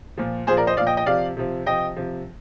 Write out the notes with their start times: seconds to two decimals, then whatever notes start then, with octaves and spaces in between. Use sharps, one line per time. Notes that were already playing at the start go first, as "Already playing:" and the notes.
0.17 A#2 F3
0.47 A#2 G#4 C5
0.51 F3
0.57 A#4 D5
0.67 C5 D#5
0.77 F3 D5 F5
0.81 A#2
0.87 D#5 G5
0.97 D#5 G5
1.06 C3 F3 D5 F5
1.37 C3 F3
1.66 C3 F3 D#5 G5
1.96 C3 F3